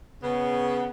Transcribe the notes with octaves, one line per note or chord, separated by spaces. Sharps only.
C#3 B3